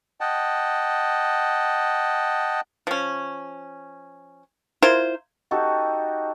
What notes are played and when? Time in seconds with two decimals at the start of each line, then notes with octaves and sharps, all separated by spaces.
0.21 D#5 F#5 G5 A5
2.87 F3 C#4
4.82 E4 F4 A#4 C5
5.51 D#4 F#4 G4 A4